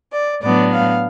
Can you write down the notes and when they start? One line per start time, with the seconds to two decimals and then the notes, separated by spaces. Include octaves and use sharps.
0.13 D5
0.42 A2 F#3 B3 D4 D5
0.72 F5